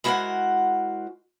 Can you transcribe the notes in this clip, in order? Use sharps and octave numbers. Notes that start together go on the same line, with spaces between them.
G#3 E4 F#4 A#4 C5 F#5